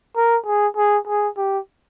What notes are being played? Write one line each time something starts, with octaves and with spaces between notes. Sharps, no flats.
A#4
G#4
G#4
G#4
G4